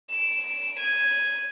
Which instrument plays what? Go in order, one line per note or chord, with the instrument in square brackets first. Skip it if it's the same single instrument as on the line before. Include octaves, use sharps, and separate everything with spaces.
[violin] D7 E7
G#6 D#7